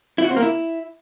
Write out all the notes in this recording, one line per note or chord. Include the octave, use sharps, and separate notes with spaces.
E4
F#4
C4
A#3
E4